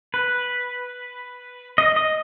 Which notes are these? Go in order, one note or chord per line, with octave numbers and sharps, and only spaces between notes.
B4
D#5
D#5